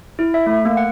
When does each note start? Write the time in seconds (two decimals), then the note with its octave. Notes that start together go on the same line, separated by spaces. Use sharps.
0.19 E4
0.34 E5
0.46 A3
0.65 A#3
0.77 F#5